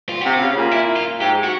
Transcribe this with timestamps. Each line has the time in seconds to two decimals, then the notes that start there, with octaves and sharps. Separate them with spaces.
0.09 F4
0.21 C3 F#4
0.33 F4
0.41 C#3
0.57 A#2
0.72 E4
0.96 F4
1.21 G#2 G4
1.44 F#4